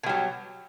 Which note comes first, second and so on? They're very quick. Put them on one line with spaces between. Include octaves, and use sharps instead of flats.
B2 G3 F#3